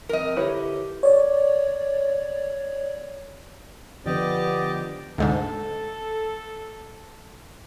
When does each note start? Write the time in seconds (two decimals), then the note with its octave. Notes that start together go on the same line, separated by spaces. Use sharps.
0.09 F3 G3 C4 A#4 D#5
0.37 D3 E4 G4 B4 C#5
1.03 C#5 D5
4.06 D3 F3 B3 G4 D5 D#5
5.18 D2 G#2 D3 A4